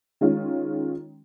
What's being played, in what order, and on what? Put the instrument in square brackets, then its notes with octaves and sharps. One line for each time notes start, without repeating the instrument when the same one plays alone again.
[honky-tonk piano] D#3 G#3 C#4 F4